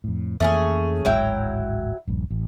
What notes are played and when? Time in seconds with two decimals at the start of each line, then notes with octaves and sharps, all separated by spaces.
0.04 F2 A2
0.40 F2 E3 A3 A#3 C#4 G#4
1.05 D1 G#1 F#3 G#3 E4 G5
2.07 D#1 A#1 G2
2.30 A1